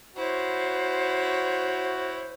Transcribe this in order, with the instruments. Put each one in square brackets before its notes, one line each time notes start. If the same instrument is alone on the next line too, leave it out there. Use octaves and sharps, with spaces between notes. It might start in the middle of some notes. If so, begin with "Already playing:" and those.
[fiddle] E4 C#5 [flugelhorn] F#4 [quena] C5